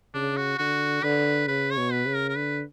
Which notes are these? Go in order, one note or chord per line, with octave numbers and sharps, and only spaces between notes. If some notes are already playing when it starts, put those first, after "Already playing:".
C#3 D4
F#4
D3 F#4
D3 B4
C#3 B4
C#5
B2
B4
C#3
A#4
A#4
D3 B4